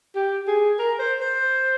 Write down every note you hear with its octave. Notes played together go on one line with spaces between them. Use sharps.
G4
G#4
A#4
C5
C5